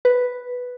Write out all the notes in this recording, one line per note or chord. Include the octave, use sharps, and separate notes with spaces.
B4